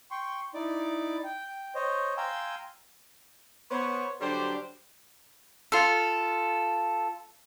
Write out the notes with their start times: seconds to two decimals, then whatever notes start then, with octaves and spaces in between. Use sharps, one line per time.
0.11 G5 C6 C#6
0.54 D#4 E4 D5 D6
1.24 G5
1.75 C5 C#5 D#5
2.17 F5 G5 G#5 A#5 C6 E6
3.71 B3 C5 C#5
4.21 D3 F#3 G3 D4 G4 C5
5.72 F4 A4